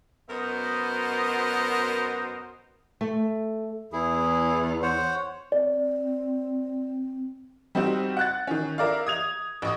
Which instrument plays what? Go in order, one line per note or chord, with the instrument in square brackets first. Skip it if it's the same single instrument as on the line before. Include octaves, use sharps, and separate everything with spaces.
[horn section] F#2 B3 F#4 A#4 C5 D#5
[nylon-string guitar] A3
[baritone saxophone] E2 [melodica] E4 G#4
[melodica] C5 C#5 F#5
[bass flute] C4 [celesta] D5
[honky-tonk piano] G3 C4 D#4 F#4
F#5 F#6 A6
D#3 C#4
E4 A#4 D5 F5
D#6 G#6 F7
A1 C#6 D#6